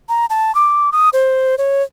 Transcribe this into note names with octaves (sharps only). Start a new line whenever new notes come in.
A#5
A5
D6
D#6
C5
C#5